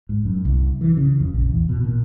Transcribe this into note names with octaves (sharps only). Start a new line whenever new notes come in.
G#2
F#2
C2
E3
C#3
F2
A#1
E2
B2
A#2